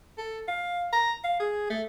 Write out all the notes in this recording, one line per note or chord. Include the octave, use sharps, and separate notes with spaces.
A4
F5
A#5
F5
G#4
A3